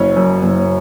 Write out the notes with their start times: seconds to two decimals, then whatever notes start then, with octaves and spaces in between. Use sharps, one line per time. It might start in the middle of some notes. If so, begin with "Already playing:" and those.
Already playing: F#1 F#3 C#4 C#5
0.16 F#2
0.43 F#1